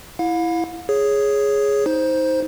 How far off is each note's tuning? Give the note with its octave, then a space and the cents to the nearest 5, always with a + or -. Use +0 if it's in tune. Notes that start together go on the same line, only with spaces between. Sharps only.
E4 +5 F5 +40
G#4 +0 C#5 +0
D#4 +25 C5 +0